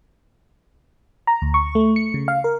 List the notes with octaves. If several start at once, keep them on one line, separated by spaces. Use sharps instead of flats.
A#5
D2
C#6
A3
C#7
C#3
F5
A#4